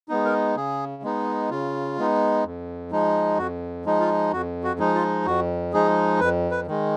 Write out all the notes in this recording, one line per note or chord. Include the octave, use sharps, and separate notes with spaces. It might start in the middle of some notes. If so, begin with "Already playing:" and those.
G#3 B3 D#4
A#4
C#3 G#4
G#3 B3 D#4
C#3 F4
G#3 B3 D#4
F2
F3 G#3 D#4
F2 F#4
F3 G#3 D#4
F4
F2 F#4
F#4
F3 G#3 D#4
F4
F2 F#4
F3 G#3 D#4 G#4
F2 B4
B4
D#3 G#3